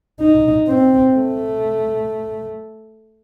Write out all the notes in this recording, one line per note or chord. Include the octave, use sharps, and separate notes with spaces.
D#4
C4
A3